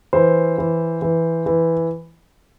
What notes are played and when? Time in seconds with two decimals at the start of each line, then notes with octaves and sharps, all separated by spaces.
0.13 E3 C5
0.58 E3
1.02 E3
1.46 E3